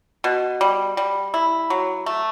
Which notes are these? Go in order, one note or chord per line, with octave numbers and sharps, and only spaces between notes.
B2
G3
G3
E4
F#3
A3